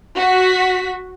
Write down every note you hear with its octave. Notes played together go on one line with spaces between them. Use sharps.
F#4 B6